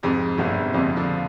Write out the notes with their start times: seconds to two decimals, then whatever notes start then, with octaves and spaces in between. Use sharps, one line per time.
0.03 F2 G#2 C3
0.38 G1 A#2 D3
0.65 C3
0.73 F2 A#2 D3
0.97 D3 F3